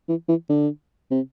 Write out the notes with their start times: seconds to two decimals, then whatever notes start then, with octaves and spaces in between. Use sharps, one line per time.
0.08 E3
0.28 E3
0.49 D3
1.11 C3